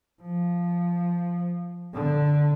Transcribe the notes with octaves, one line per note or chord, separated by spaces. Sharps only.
F3
D3